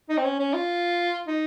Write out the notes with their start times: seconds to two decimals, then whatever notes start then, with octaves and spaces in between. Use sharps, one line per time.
0.10 D#4
0.18 C4
0.24 C#4
0.40 C#4
0.54 F4
1.28 D#4